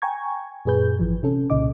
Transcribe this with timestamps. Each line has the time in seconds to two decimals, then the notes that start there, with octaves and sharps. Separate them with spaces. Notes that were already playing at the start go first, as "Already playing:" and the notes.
0.02 G5 G#5 A#5 C#6 G#6
0.65 F#2 A#2 G#4 B4 G6
0.99 G#1 E3 F3
1.23 C3 C#4 A4
1.50 C2 A#2 C#3 D#5 D6